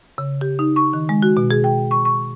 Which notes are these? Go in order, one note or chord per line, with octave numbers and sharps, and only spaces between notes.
C#3
G4
D#4
C#6
D#3
G#3
F#4
B2
G#4
G5
C#6
C#6